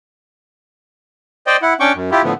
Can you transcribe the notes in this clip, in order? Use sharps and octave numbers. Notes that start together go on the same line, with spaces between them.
C5 D5 D#5 G5
E4 F#5
C#4 D4 G5 C#6 D6
F#2
E4 F4 G4
A2 D3 F3 B3